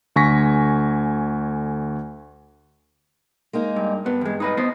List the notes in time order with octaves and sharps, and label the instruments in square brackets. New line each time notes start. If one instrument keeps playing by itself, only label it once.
[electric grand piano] D2 D3 G#5 C#6 A#6 B6
[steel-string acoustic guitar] G#3 A#3 D#4
[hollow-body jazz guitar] G2
[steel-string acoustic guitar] G2 [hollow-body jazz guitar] B3
[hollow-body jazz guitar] E2 G#3
D#4 B4 D#5
B3 C5 D#5